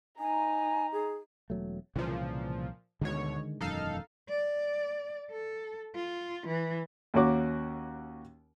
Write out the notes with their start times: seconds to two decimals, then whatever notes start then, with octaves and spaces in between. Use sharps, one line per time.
0.19 D#4 G#5 A#5
0.93 G#4
1.50 E1 F#3 A3
1.96 C2 A#2 C#3 E3 F3
3.01 D2 B2 D3 D#3 G#3 C#5
3.61 E1 F#2 D#3 D#4 A4 F5
4.29 D5
5.31 A4
5.95 F4
6.46 E3
7.14 D#2 A#3 C#4 F#4 D6